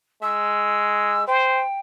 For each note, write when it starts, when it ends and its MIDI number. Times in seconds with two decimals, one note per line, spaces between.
0.22 1.26 56
0.22 1.25 88
1.27 1.64 72
1.27 1.79 79